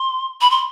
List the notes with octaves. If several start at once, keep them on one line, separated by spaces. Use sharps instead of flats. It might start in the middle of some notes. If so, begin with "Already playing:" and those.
Already playing: C6
B5
C6